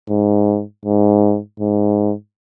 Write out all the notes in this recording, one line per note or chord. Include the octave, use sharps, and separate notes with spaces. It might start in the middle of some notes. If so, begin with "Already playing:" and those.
G#2
G#2
G#2